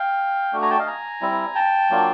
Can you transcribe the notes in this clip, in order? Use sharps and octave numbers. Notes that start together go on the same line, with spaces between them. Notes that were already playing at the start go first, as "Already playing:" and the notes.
Already playing: F5 G5
A3 D4 F#4
G#5 A#5
G5 A5
D#5 F5
G#5 A#5
G3 C4 E4
G5 A5
F#3 A#3 D4 F4